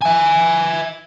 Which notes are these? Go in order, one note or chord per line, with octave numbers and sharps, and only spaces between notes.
E5 G#5